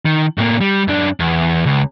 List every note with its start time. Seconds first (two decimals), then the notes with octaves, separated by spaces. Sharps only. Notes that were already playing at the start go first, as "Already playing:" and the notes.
0.05 D#3
0.38 A2 A#3
0.61 G3
0.88 F#2 D4
1.20 E2
1.66 C#2